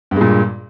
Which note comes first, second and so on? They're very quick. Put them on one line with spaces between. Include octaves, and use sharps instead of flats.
G2 G#3 A#2